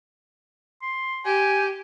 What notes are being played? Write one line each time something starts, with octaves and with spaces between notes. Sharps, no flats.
C6
G4 G#5